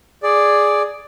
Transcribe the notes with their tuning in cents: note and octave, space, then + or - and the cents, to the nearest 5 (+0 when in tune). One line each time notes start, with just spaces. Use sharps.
G#4 +0 D5 +0